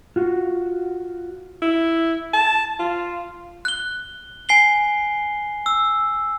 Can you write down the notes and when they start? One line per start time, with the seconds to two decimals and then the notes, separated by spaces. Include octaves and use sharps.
0.16 F4 F#4
1.62 E4
2.34 A5
2.79 F4
3.65 F#6 G7
4.49 G#5 C7 G7
5.66 E6